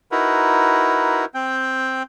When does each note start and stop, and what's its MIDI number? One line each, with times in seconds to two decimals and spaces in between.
0.11 1.25 63
0.11 1.25 64
0.11 1.25 66
0.11 1.25 70
0.11 1.25 71
1.34 2.03 60
1.34 2.03 79